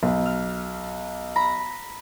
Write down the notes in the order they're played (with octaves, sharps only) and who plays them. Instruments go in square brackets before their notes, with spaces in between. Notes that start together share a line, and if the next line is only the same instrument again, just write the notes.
[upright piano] B1
[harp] F6
A#5 B5